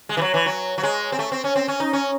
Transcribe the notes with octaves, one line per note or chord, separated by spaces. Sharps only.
G#3
E3
F#3
E3
F#3
F#3
G#3
C4
A3
C4
C#4
C4
C#4
D#4
C#4